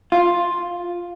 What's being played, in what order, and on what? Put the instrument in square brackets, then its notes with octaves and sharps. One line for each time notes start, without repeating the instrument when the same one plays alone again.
[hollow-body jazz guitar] F4